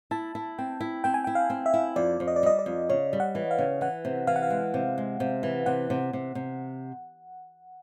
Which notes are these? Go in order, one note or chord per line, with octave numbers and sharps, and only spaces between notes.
E4 A5
E4
C4 G5
E4
C4 G5
G#5
E4 G5
F5
C4
E5
E4
F2 D5
F2
D#5
D5
G3 D#5
D5
F2
C#3 C#5
G3
F#5
E3
F5
C#3
E3 F#5
C3
E3 F5
F#5
F5
G#3
C3
G#3
C3
E3
C3 F#5
C3
C3
C3